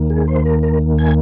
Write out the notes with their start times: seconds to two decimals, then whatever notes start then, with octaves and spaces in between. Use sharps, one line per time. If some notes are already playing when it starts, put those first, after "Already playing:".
Already playing: D#2 D#3 A#3
0.10 G#4
0.28 C5
0.45 A#4
0.63 A#4
0.98 G#5